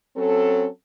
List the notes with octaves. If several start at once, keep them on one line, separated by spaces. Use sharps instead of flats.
F#3 C4 C#4 A4